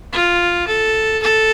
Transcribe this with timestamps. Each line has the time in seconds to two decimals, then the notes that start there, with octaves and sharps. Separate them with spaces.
0.13 F4
0.67 A4
1.23 A4